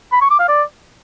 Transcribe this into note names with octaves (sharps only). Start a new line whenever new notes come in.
B5
C#6
D6
F5
D5